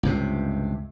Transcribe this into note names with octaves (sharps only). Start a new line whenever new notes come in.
C#2 G2 C3